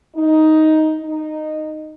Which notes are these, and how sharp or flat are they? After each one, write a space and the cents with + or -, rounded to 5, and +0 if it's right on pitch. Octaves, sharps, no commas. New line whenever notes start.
D#4 +10
D#4 -10